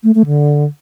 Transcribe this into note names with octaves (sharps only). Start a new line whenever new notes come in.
A3
A3
D3